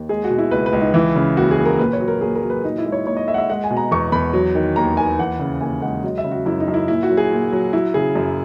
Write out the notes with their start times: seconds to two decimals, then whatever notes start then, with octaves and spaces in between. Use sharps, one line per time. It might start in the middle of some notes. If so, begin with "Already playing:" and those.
Already playing: D#2
0.09 G#3 G#4
0.24 F#4
0.30 B2
0.38 E4
0.51 C#2 B4
0.66 B4
0.73 C#2
0.81 D#4
0.94 E3 E4
1.16 C#3
1.37 D#2 F#4
1.51 G#4
1.58 D#2
1.65 A#4
1.79 A#2 B4
1.93 C#5
2.00 F#3
2.08 A#4
2.21 A#2 G#4
2.35 A#4
2.43 F#3
2.50 B4
2.64 A#2 D#4
2.78 E4
2.85 G#3
2.92 C#5
3.06 A#2 C#5
3.17 D#5
3.28 G#3 E5
3.34 F#5
3.38 E5
3.50 G#3 F#5
3.64 G#5
3.71 B2
3.77 A#5
3.91 E2 C#6
4.12 E2 B5
4.33 F#3
4.55 D#3
4.76 D#2 A#5
4.97 D#2 G#5
5.19 E3 F#5
5.39 C#3
5.61 D#2 G#5
5.82 G#3 F#5
6.03 F#3 D#5
6.18 E5
6.24 C#3
6.31 F#4
6.46 F#2 E4
6.60 D#4
6.68 F#2
6.74 E4
6.88 A#2 E4
7.03 F#4
7.10 F#3
7.17 G#4
7.31 A#2
7.52 F#3
7.73 F#3 E4
7.94 C#3 G#4
8.16 F#2